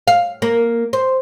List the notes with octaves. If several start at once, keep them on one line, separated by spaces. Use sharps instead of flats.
F5
A#3
C5